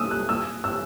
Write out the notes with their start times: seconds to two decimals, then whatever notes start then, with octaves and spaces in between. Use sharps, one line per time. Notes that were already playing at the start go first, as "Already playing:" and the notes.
Already playing: D#6 E6
0.11 F#6
0.29 E6
0.64 E6